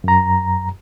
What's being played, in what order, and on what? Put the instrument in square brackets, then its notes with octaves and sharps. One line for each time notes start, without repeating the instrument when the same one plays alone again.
[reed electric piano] F#2 A#5